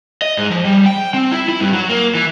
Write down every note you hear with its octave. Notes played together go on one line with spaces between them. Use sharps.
D#5
G#2
F3
G3
G5
C4
E4
E4
G2
F#3
A#3
E3